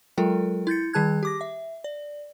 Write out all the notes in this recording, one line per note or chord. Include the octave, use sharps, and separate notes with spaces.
F#3 G#3 F4 A4 A#4 G5
E4 G6 A6 C#7
D#3 G3 G#4 A5 F#6 G#6
G4 D6 A#6
E5
D5